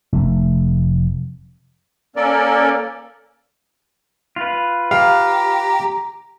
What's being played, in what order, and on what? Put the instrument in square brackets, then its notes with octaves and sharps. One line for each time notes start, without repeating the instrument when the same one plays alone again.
[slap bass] F1
[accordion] A#3 C#4 A4 A#4 D5
[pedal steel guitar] F4 B4
[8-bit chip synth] G4 [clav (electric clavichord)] F5 [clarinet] A#5